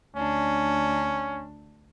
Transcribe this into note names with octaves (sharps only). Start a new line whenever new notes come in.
D2 C#4 D4